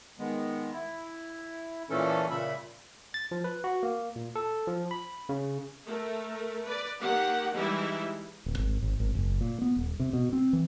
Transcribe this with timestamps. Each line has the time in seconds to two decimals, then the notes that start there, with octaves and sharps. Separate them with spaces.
0.19 D#3 G#3 B3
0.73 E4
1.90 A#2 E3 A3 C#4 A4
2.31 A#2 C#3 E5 B5
3.14 A6
3.31 F3
3.44 B4
3.64 F#4
3.83 A#3
4.16 A#2
4.36 A4
4.67 F3
4.91 B5
5.29 C#3
5.87 A3 A#4
6.65 B4 D5
7.01 D#3 A#3 G4 F#5
7.55 E3 G3 G#3 D#4 E4
8.46 D1
8.58 G#1
8.82 G#1
9.00 G#1
9.15 F#1
9.41 A#2
9.62 B3
9.77 D#1
10.00 C3
10.13 B2
10.33 C4
10.53 E3